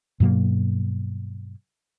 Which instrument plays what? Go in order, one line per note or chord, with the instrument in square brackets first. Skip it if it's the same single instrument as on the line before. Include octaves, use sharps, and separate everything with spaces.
[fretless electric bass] G2 B2 F#3 A#3